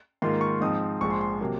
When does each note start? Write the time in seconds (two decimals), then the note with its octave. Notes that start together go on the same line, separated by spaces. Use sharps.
0.22 G#2 D#3 A#3 F4 C6
0.41 C#6
0.61 G#2 F3 C4 D#4 D#6
1.01 A#1 G#2 F3 G#3 C#6
1.10 C6
1.21 C6
1.41 C3 F#3 A#3